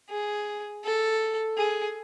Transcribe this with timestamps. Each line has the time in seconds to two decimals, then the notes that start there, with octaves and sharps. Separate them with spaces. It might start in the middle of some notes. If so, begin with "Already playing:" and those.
0.10 G#4
0.84 A4
1.58 G#4